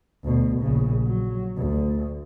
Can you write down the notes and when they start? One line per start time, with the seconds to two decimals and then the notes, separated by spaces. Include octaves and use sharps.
0.25 D2 B2
0.61 A#1 C#3
1.06 F#3
1.57 D2